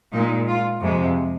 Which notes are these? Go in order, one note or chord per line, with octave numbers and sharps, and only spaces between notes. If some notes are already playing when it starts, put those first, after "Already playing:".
A#2 G#3 D#4
F4
F2 C3 G#3